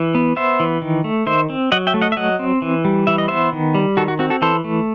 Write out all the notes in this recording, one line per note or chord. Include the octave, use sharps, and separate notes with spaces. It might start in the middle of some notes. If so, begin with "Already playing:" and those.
Already playing: E3
B3
B3 C5 E5
E3
D#3
A3
D#3 C5 E5
C4
F#3 D#5 F#5
E5 G5
A3
D#5 F#5
E5
F#3 D#5 F#5
C4
E3
G3
E3 E5
D#5
B3 C5 E5
D#3
G3
D#3 F#4 A4
F#4
C4 F#4
F#4 A4
E3 A4 C5
A3